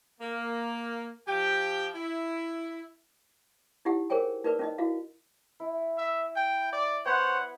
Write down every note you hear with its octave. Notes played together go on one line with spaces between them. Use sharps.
A#3
F3 G4 G5
E4
D#4 E4 G4 F#5
G#4 A#4 C5 C#5 G5 G#5
D#4 A#4 B4 D5
C#4 D#4 D#5
E4 F#4 F5
E4
E5
G5
D5
B3 C5 C#5 F#5 B5